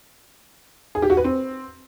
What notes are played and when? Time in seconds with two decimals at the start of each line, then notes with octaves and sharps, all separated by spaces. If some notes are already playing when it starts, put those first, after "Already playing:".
0.95 G#4
1.02 G4
1.10 F#4
1.17 B4
1.24 C4